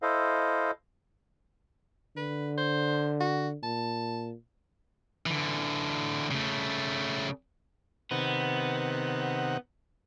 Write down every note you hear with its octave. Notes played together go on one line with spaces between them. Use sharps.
E4 A4 C5 D#5 F5
D3 B4
C5
F#4
A#2 A5
D3 E3
C#3 A3
C3 D#3 B3 F#5